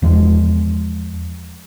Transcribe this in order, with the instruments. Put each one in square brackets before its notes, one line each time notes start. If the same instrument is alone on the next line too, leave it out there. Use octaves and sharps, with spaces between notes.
[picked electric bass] E2 F3 G#3